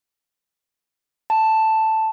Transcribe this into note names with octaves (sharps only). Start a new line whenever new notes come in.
A5